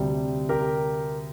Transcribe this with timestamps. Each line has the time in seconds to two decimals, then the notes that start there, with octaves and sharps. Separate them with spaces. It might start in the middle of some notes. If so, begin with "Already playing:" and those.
Already playing: D2 C3 G3
0.49 G4 A#4